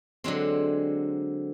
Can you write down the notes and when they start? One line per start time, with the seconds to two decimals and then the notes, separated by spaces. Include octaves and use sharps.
0.24 D3 F#3 G#3 C4